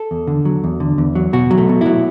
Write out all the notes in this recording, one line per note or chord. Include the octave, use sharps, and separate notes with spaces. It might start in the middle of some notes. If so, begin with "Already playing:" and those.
Already playing: A4
E2
D3
F#3
E2
D3
E2
F#3
B2 F#4
F#3
A3
B2
F#3 E4